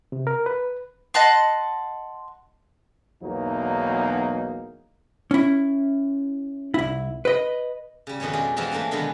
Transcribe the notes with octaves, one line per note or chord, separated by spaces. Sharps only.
C3
A#4
B4
D#5 F#5 A5 C6
B1 E2 F#3 A#3 D#4
C#4 E4
C2 E4
B4 D#5
C#3 G3
F2 B2 D#3 C#4 C#5
G#3 F4 G4 G#4 D5
E3 F3 G#3 B3 C4 G4
E3 A3 A#3 C4 D4
B2 D3 D#3 F#3 G#3 B3